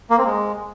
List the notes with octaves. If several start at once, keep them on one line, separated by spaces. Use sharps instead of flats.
A#3
C4
G#3